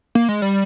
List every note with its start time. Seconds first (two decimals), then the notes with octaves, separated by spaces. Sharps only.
0.15 A#3
0.29 G#3
0.42 G3